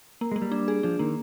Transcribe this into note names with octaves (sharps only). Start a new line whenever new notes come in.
A#3
G#3 A#3
G3
D4
G#4
F3 D4
D#3 A#3